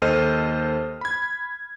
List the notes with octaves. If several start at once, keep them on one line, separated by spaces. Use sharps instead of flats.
D#2 A4 C5 D#5 F6 D#7
B5 G#6